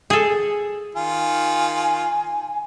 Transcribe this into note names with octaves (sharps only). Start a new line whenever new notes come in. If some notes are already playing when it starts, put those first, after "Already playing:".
G#4 A4
D#3 F4 G#5